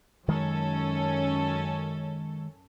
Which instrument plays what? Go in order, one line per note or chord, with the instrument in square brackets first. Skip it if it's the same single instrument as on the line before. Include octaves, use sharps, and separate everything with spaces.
[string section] F#2 C#4 A4 [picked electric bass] D#3 G#3